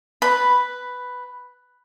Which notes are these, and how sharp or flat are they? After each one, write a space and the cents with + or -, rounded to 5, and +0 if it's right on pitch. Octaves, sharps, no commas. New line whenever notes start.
B4 +5 B5 +0